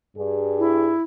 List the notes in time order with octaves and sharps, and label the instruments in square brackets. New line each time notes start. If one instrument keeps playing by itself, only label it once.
[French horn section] G2 G#4
[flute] E4